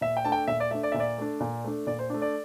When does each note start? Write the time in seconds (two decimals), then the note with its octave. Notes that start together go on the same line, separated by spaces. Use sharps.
0.01 A#2 E5
0.17 G5
0.25 A3 D4 A5
0.32 G5
0.47 A#2 E5
0.60 D5
0.71 A3 E5
0.74 D4
0.83 D5
0.92 A#2 E5
1.00 D5
1.18 A3 D4
1.40 A#2
1.64 A3 D4
1.87 A#2 D5
1.99 C5
2.10 A3 D4
2.22 D5